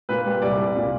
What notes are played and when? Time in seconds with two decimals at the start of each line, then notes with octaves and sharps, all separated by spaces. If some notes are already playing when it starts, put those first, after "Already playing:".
0.09 A#2 B4
0.25 G3
0.42 C2 D5
0.58 C2
0.76 A#2